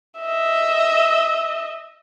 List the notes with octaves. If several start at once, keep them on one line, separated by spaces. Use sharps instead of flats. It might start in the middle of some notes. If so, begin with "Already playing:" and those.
D#5 E5